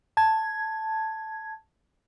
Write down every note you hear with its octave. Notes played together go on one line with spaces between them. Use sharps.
A5 G#6